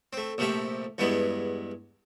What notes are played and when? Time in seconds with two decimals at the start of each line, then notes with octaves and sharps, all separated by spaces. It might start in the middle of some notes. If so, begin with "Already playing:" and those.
0.13 A3 C4
0.38 A#1 C3 F3 A3 G4
0.98 E2 G2 E3 G#3 B3